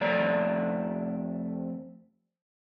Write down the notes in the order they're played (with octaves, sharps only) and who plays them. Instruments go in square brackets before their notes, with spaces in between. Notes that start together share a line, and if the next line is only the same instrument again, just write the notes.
[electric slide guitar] F2 A3 D5 A#5